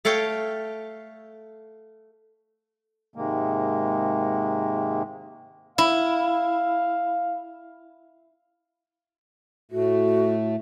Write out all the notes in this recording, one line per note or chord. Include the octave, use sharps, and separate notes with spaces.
A3 A4 C#5 F5 G5
G#2 C3 D#3 G#3 A#3
E4 F5
A2 A3 F#4